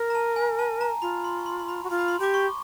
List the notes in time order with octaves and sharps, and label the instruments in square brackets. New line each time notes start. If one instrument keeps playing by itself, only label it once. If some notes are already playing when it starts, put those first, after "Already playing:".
Already playing: [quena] A#4
[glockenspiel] A#5
A5
G#5
A5
A#5
[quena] F4 [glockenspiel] B5
[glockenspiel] C6
C#6
C6
C6
B5
[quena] F#4
[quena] F4 [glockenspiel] C6
[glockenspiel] B5
C6
[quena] G4 [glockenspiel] D6
[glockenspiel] C#6